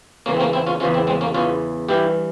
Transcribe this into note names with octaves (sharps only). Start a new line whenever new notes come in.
E2 C#3 E3 A#3 C#4
C4
A#3 C#4
C4 E4
C#4 F4
E2 C#3 E3 C#4 F4
C4 E4
G#3 C4
A#3 C#4
E2 C#3 E3 C#4 F4
G2 E3 E4 G4